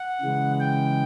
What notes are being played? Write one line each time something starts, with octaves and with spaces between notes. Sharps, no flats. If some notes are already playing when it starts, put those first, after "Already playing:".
Already playing: F#5
C#3 E3 G#3
G5